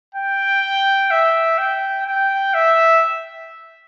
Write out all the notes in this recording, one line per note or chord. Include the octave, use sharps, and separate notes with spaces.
G5
E5
G5
G5
E5